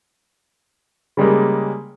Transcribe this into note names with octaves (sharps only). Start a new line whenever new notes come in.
C#3 G3 G#3 A#3